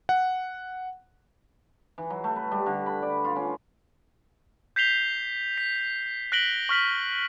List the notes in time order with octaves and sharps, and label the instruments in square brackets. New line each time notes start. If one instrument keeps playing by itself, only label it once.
[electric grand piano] F#5
[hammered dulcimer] E3
F#3
A3
B4
G3
D3
B5
D5
F4
C#4
[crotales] G6 B6 C7 F7 G7
B6
F#6 A#6 B6 D7 F#7 G7
C#6 F6 B6 F#7